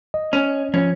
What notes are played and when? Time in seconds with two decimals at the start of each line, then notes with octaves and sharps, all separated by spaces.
0.14 D#5
0.33 C#4
0.74 F3 C#4